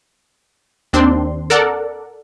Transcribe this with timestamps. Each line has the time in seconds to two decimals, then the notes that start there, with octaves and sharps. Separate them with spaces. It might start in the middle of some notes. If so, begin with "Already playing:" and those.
0.93 D#2 C4 D4 C6
1.50 A4 A#4 D5 F#5